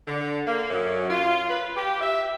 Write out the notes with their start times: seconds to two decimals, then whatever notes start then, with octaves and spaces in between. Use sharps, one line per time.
0.07 D3
0.47 A#3
0.70 F#2
1.10 F4
1.50 B4
1.77 G4
2.01 E5